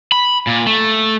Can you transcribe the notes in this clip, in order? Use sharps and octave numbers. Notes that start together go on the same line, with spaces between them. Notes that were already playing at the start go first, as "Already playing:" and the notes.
B5
A#2
A3